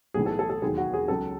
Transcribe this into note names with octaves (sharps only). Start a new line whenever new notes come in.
B1 A2 E3 G#4
A4
A4
A4
E1 D#2 D#3 F#3 G#4
F#4
G#4
C#2 C#3 F#3 A4